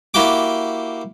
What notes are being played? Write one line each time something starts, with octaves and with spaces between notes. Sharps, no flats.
A#3 E4 F#4 G4 G5 D6